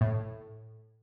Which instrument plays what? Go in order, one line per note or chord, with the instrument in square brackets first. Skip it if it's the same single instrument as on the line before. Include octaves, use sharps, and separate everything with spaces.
[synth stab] A2